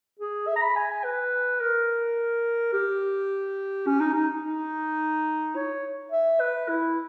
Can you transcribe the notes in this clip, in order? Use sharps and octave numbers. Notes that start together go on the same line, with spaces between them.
G#4
E5
A#5
B5
G#5
G#5
B4
A#4
G4
C#4
D#4
D#4
D#4
C#5
E5
B4
E4